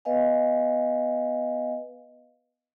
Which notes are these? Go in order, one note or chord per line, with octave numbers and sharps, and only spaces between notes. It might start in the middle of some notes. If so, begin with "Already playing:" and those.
B3 B4 D#5 F5 G#5